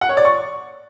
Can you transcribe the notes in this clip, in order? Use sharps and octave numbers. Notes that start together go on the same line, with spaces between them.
F#5
C#5
D5
C#6